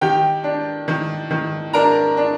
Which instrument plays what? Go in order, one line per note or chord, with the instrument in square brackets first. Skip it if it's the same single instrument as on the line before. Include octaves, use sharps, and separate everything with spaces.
[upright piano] D#3 G4 G5
D4
D#3
D#3
D4 A#4 A#5
D4